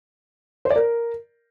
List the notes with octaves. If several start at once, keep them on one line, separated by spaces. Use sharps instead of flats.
C5
D5
A#4